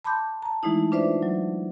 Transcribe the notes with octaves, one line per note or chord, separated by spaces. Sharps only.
A5 B5 C6 D6 G6
A5 A#5
E3 G#3 A3 D#4 E4
D4 F4 B4 C5 D5 E5
F#3